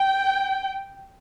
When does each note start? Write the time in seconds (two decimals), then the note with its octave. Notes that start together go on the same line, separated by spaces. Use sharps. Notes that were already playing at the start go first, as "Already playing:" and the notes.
Already playing: G5